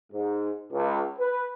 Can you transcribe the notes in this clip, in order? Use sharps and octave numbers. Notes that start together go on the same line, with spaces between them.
G#2
C#2
B4